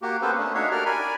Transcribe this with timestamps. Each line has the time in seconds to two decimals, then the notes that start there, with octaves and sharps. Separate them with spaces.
0.02 A#3 F#4 G4
0.22 A#3 B3 C#4 A4 B4 C5
0.37 A3 C#4 D4
0.55 D4 D#4 F#4 C#5 E5 F5
0.71 F#4 G4 A#4 D5 F6
0.86 A#4 D5 G#5 B5